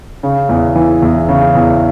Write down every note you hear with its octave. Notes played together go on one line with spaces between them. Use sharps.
C#3
E2
E3
E2
C#3
E2